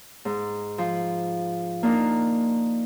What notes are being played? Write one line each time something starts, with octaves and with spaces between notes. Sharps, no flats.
G#2
F3
A#3 D4 D#4